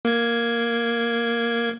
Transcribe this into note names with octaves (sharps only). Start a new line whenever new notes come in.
A#3 G#6